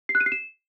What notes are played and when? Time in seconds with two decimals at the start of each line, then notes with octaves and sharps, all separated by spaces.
0.09 C7
0.15 F#6
0.20 D#7
0.26 C7
0.32 E7